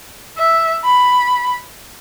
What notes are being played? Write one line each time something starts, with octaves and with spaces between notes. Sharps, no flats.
E5
B5